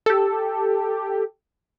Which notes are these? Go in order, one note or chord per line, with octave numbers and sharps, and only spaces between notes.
G4 A4